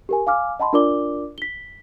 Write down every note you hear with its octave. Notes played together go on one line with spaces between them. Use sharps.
G4 A#4 G#5
F5 G#5 D6 F6
D#5 F#5 A5 B5 C6
D4 F4 A#4 D5 D6 G7
B6 G7